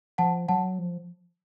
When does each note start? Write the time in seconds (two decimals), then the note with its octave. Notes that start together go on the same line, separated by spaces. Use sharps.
0.18 F3 F#5 A5
0.48 F#3 F#5 A5
0.79 F3